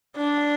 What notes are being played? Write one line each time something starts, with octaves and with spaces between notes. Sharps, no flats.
D4